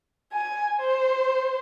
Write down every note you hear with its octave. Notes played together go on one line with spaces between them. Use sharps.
G#5
C5